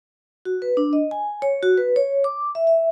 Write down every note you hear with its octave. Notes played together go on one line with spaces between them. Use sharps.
F#4
B4
D4
D#5
G#5
C#5
F#4
B4
C#5
D6
E5
E5